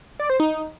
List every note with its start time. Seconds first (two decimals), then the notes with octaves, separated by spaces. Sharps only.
0.20 D5
0.30 C5
0.40 D#4